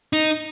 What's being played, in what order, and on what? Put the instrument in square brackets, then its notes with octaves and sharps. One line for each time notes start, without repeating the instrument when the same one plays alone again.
[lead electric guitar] D#4